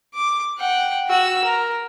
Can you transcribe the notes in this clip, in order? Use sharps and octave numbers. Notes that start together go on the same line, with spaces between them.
D6
F#5 G5
F#4 E6
A#4